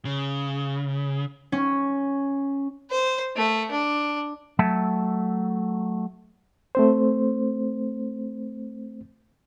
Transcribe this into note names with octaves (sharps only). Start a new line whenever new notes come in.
C#3
C#4
C5
A3
D4
F#3 A3 E5 A5
A3 C4 C5